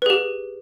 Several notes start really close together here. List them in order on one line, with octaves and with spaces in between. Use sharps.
B4 G#4 G4